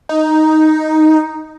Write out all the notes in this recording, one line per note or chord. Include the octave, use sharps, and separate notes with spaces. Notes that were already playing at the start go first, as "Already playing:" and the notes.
D#4